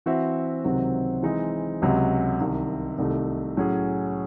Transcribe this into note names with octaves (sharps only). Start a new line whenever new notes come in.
E3 C4 F#4 C5 E5
C#2 C3 D#3 F#3 C4
E3 G#3 C4 D#4
C#2 C3 F#3 C#4
C2 C3 D#3
C2 C3 D#3 A3 D#4
A2 F#3 C#4 G#4